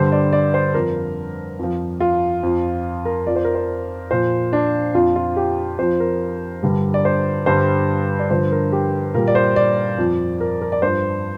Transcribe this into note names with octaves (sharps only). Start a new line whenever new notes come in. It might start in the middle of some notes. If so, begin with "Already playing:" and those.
Already playing: G2 D3 G3 C5
D5
D5
C5
F2 F3 A#4
F2 F3
F4
F2 F3
A#4
F2 F3 D5
C5
A#4
C5
A#2 F3 C5
D4
F2 F3 F4
F4
G4
F2 F3 C5
A#4
G2 D3 G3
D5
C5
G2 D3 G3 C5
D5
G2 D3 F3 C5
A#4
G4
A#2 G3 A#4
D5
C5
D5
F2 F3
A#4
A#4
D5
G2 F3 C5